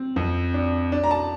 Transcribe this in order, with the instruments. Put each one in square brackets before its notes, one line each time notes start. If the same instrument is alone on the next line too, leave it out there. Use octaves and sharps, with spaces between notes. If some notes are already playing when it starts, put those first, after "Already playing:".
Already playing: [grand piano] C4
F2
D4
D4
A#5
A5